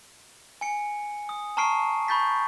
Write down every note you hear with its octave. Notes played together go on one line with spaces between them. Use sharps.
G#5 C#7
D#6
A5 A#5 C#6 F6 C7 D7
B5 C#6 G6 A6 B6